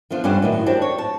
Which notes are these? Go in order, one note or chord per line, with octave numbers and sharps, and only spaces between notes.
F3 B3 D4 F4
G2 C#4 D4 G4 C5 F#5
A2 D#3 F#3
D4 F#4 G4 C5 D5
C#5
A5